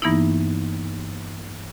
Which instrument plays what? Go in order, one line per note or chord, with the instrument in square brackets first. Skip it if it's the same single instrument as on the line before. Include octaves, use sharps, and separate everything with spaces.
[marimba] G2 E3 A#3 B3 D#4 E4